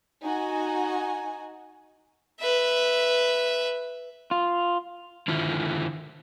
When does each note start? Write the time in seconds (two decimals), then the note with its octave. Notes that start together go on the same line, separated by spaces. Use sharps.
0.24 D#4 F#4 G#5
2.40 B4 E5
4.31 F4
5.28 D3 D#3 E4 F4